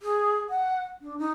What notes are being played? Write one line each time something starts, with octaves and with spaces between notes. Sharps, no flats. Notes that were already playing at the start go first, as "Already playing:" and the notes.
G#4
F#5
D4
D#4